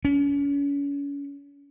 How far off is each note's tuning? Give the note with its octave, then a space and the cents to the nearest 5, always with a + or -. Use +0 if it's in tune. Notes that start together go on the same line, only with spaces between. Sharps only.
C#4 +35